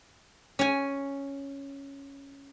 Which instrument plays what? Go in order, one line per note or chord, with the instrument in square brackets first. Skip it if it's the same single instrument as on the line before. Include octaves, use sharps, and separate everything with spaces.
[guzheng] C#4 G#5